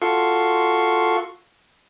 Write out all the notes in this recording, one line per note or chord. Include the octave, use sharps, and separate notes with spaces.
F4 F#4 A4 C6 C#6